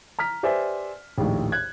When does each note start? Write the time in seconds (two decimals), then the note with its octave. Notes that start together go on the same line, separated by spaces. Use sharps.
0.19 A#5 F6 B6
0.43 G4 B4 C5 D5 E5 G#5
1.18 A#1 D#2 A2
1.52 F#6 G#6